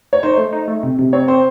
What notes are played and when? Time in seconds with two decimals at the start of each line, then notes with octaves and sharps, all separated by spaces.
0.13 C#5
0.23 D#4 C5
0.37 A3
0.53 D#4
0.68 A3
0.83 C3
0.99 C3
1.13 C4 C#5
1.28 C4 C5